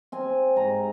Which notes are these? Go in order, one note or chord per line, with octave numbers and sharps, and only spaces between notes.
C4 G#5
G#2 A#5